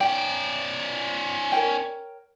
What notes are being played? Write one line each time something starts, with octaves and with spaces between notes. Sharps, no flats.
C#4 D5 G5
A#4 C#5 G5